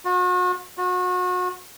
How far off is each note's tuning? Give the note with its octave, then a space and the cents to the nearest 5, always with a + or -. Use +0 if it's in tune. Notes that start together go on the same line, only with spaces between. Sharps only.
F#4 -40
F#4 -35